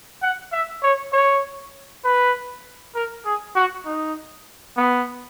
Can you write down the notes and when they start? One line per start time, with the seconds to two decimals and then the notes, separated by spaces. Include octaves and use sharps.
0.22 F#5
0.52 E5
0.83 C#5
1.13 C#5
2.04 B4
2.95 A#4
3.25 G#4
3.55 F#4
3.85 D#4
4.77 B3